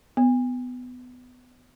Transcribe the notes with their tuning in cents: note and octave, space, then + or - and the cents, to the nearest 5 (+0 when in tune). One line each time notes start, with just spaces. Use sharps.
B3 +20